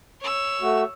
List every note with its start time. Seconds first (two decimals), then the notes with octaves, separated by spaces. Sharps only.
0.20 C#5 E6
0.61 A3 F#4